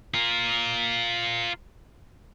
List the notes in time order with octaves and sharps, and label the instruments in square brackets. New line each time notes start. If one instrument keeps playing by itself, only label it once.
[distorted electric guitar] F4 A#4